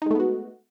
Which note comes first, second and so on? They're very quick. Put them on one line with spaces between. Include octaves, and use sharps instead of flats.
D#4 G#3 A3 B3 F#4